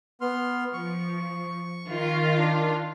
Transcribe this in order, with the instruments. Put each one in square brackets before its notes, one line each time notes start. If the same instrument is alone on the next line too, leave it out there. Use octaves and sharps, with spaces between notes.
[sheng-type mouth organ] B3 C6 F6
[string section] F3 [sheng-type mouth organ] C#6
[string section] D#3 F4
[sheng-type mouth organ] D4